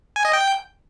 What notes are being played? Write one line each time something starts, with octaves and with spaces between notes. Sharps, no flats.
G#5
D#5
G5